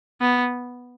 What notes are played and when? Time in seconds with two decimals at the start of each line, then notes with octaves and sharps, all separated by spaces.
0.21 B3